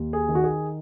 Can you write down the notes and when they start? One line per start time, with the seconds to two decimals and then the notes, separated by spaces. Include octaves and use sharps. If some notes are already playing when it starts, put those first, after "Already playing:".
Already playing: D#2
0.13 G#4
0.29 D#3
0.35 F#4
0.44 G#4